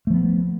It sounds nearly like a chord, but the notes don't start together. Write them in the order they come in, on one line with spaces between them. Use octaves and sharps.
A3 F3 B3